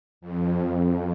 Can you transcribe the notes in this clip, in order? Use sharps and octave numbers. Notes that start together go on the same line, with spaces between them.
F2